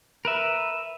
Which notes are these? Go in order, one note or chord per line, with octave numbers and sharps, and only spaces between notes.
A#4 B4 E5